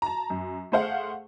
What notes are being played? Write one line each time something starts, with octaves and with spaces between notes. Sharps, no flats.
A5 A#5
F#2
A3 G#4 C5 F5 F#5